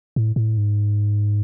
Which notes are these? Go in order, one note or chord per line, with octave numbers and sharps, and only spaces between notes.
A2
A2
G#2